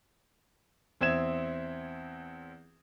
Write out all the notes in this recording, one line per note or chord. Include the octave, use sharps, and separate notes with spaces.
E2 C4 E5 G#6 E7